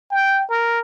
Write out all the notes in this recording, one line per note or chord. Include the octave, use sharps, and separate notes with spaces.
G5
A#4